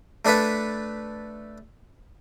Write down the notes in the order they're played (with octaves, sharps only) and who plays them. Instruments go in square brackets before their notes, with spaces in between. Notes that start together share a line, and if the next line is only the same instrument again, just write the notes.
[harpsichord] A3 D4 A4 B4 E5